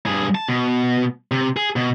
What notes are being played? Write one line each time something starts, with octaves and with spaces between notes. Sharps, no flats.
G2 G#4
A5
B2
C3
G#4
B2